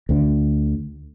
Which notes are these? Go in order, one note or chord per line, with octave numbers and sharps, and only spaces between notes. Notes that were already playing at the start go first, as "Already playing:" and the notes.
D2 D3